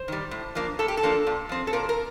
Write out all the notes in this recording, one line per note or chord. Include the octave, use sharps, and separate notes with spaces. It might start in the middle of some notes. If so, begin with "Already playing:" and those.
Already playing: C5
D#3 G3
A2
F3 A#3 D4
A2 A4
G4
A4
F3 A#3 D4
A#2
F3 C4
A4
A#2 A#4
A#4